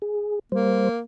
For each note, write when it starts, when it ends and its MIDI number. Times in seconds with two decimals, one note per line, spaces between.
0.02 0.39 68
0.52 0.89 55
0.52 1.01 58
0.52 0.89 72